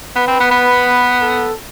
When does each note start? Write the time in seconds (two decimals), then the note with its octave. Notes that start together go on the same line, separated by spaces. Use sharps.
0.16 B3 B4
0.27 C4
0.40 B3
0.51 B3
1.22 A4